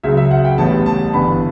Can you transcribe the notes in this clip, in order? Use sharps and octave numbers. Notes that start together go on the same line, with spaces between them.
C#2 C#3 F#3 E5
E5
F#5
G5
A1 A2 G3 B3 A5
A5
G1 G2 E3 B3 D4 B5